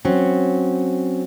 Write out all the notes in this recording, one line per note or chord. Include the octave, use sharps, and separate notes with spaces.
F#3 C4 C#4